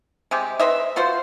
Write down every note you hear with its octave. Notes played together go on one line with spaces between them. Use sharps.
C3 G#3 G4
B4 C5 D#5 E5
B3 F4 F#4 C5